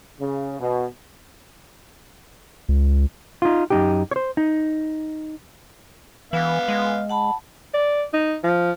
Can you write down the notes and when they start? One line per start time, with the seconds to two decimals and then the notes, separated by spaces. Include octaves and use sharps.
0.20 C#3
0.60 B2
2.69 C#2
3.42 D#4 F4
3.70 F#2 D#4 G4
4.11 C5 C#5
4.37 D#4
6.33 E3 B3 F5
6.68 G#3
7.09 F#5 A5 B5
7.74 D5
8.14 D#4
8.44 F3